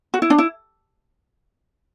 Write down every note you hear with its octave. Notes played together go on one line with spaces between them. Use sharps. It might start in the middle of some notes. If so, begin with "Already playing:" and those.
F#4
E4
D4
E4